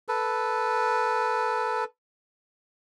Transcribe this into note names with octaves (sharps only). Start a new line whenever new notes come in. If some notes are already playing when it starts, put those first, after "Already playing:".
A4 B4